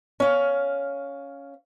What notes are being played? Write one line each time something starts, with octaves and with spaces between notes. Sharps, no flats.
C#4 F5